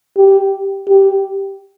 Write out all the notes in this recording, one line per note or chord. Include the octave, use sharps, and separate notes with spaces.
G4
G4